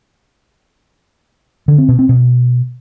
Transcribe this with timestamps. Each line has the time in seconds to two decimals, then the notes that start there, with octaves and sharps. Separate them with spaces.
1.68 D3
1.78 C4
1.89 B2
1.99 C4
2.09 B2